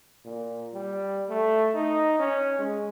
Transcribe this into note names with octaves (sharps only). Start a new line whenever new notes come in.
A#2
G3
A3
D#4
C#4
G#3